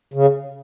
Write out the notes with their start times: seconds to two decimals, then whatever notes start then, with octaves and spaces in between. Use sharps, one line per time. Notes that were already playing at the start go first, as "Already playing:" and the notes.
0.14 C#3